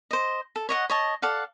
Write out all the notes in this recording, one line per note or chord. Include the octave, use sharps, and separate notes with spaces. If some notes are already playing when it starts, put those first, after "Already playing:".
C5 D#5
A4
C#5 D#5 F#5
C#5 D#5 A5
A4 D5 F5 F#5